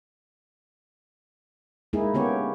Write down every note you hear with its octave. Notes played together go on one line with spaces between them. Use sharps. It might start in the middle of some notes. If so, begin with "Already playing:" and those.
G#3 A#3 D#4 E4 G#4
D3 A#3 B3 C#4 G4 C#5